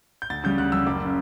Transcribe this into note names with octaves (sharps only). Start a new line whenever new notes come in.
G6
D2 A6
C#3 G3 G6
D2 F#6
C#3 G3 E6
F#1 D6
C#3